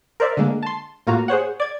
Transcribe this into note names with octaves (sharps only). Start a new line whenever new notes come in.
A#4 C5 D5 E5
D3 G#3 A#3
A5 C6
A2 A#3 F4 F#4 A#5
G#4 C5 C#5 F#5
D5 G#6